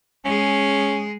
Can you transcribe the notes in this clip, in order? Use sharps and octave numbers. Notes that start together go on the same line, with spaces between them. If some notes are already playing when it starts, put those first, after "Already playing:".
G#3 C#4 G#4